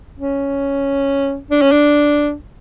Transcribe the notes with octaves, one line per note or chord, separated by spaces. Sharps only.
C#4
D4
C#4
D4